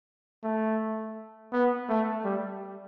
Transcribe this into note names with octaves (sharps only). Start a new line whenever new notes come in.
A3
B3
A3
G3